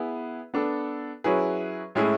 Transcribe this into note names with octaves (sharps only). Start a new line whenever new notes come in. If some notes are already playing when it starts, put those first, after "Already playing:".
Already playing: B3 E4 G#4 B4
B3 D4 A4
F#3 C#4 E4 G#4 B4
A2 G#3 C#4 E4 G#4